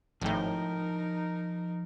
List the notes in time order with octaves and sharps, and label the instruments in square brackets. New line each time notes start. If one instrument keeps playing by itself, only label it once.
[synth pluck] G#1 A2 [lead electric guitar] F3 G5 [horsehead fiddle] D#4 A#4